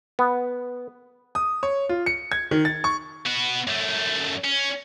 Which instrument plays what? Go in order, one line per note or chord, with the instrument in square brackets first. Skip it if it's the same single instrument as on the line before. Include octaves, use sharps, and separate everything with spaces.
[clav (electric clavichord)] B3
[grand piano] D#6
C#5
F4
C#7
G#6
D#3
A6
C#6
[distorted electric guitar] B3 F#4
F#2 A3
C#4